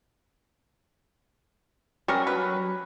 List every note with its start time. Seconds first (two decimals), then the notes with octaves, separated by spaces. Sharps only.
2.08 F#3 G3 C#4 A#4
2.27 B4